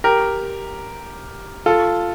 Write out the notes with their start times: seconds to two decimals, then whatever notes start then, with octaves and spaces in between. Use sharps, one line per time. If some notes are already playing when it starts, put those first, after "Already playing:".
0.04 G4 A#4
1.66 F4 A4